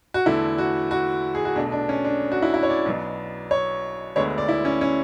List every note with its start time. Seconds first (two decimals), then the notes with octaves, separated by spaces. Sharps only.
0.14 F#4
0.26 E2 D3 A3 E4
0.58 F#4
0.91 F#4
1.35 G#4
1.45 F#4
1.56 B1 B2 A3 D4
1.72 D4
1.89 C#4
2.05 D4
2.32 F#4
2.42 E4
2.54 E4
2.63 C#5
2.70 D5
2.86 B1 B2 F#3 B3
3.51 C#5
4.16 D2 D3 G#3 B3 C#5
4.38 D5
4.48 E4
4.65 C#4
4.81 C#4